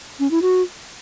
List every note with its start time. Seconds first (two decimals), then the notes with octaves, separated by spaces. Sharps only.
0.20 C#4
0.31 E4
0.42 F#4